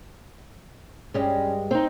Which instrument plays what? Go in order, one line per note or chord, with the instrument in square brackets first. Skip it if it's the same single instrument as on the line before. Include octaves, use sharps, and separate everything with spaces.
[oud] G2 G3 G#3 [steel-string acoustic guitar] C#4
[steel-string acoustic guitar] C4 D#4